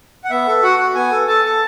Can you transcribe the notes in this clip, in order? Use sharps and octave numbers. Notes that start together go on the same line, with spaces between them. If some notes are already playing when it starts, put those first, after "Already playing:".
F#5
B3 E5
A4
F#4 F#5
F#4
B3 G#5
A4
A4 A5
A4